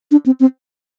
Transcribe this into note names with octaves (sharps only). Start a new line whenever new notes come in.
D4
C4
C4